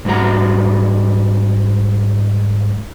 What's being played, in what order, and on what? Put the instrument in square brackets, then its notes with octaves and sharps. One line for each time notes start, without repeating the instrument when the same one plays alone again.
[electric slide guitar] G#2 G3 F#4 A#5